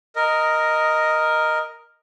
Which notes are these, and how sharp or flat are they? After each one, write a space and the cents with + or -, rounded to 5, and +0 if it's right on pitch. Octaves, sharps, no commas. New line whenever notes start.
A#4 +0 D#5 +0